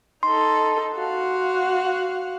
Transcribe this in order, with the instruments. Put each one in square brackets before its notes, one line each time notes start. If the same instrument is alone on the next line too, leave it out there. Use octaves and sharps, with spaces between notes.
[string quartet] D#4 A4 [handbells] C6
[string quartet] F#4 F5 F#5